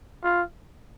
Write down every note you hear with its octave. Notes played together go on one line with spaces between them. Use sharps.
F4